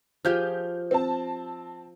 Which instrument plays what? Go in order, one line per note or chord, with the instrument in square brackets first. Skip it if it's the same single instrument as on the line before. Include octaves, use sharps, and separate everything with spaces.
[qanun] F3 G4 G#4 [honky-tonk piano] F6 G6
[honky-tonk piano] C4 A5